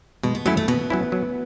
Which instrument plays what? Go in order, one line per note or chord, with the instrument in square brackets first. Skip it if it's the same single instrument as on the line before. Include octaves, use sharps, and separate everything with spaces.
[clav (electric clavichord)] B2 [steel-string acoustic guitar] G#3
[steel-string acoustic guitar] B3
[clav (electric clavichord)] F#3 C#4 E4 [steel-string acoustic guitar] A3
[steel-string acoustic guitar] A3
[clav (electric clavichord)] B2 [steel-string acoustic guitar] B3
[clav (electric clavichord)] F#3 C#4 E4
F#3